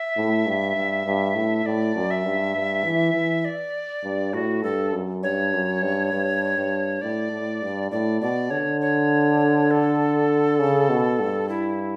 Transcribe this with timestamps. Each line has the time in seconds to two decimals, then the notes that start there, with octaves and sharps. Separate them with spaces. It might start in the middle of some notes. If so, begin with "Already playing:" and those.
Already playing: E5
0.16 A2
0.46 G2
0.76 G2
1.06 G2
1.35 A2
1.65 A2 D5
1.95 F#2
2.10 E5
2.24 G2
2.55 G2
2.84 E3
3.14 E3
3.45 D5
4.04 G2
4.33 A2 F#4
4.63 G2 A4
4.93 F#2
5.23 G2 C#5
5.53 F#2
5.82 G2
6.13 G2
6.58 G2
7.01 A2 D5
7.31 A2
7.62 G2
7.91 A2 D5
8.21 B2 D5
8.50 D3 C#5
8.81 C#5
9.71 A4
10.59 C#3
10.89 B2
11.20 G2
11.49 E4